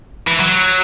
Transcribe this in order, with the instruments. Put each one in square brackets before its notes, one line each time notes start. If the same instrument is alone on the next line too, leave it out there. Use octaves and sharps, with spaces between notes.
[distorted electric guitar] E3
F#3